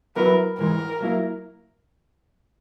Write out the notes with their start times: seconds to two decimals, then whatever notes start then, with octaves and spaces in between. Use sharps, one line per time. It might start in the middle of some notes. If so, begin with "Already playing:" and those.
0.16 F#3 B3 E4 A#4 B4
0.58 G#2 E3 G#3 A#4
1.00 F#3 A#3 E4